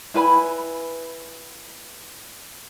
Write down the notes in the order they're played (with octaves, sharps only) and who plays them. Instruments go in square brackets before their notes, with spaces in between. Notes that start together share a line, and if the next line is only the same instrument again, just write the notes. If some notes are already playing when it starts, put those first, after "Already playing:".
[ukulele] E4 B4 G#5 B5